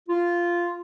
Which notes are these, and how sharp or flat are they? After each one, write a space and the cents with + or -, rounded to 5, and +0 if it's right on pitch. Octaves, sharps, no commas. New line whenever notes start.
F4 -10